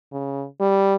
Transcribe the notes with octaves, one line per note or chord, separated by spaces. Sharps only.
C#3
G3